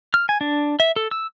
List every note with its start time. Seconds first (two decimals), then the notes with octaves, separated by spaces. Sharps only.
0.14 F6
0.29 G#5
0.41 D4
0.80 E5
0.96 A4
1.11 E6